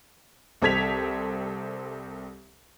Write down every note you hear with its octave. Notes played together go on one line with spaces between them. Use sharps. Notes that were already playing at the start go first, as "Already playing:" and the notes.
C2 C4 A4 G#6 B6 F7